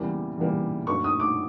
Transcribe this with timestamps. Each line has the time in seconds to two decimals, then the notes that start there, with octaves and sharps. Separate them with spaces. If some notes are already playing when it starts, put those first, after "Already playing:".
Already playing: E2 C#3 E3 G3 A#3
0.37 E2 C#3 E3 G3 A#3
0.87 F#2 D3 F#3 A#3 C#6
1.04 D#6
1.20 D6